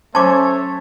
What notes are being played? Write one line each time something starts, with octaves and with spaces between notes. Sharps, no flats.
F#3 A3 C#4 C5 C#5 A5 D6